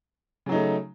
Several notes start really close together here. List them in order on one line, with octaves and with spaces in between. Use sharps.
C#3 F#3 D#4 A3